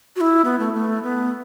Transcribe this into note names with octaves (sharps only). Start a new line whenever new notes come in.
F#4
E4
B3
A3
A3
B3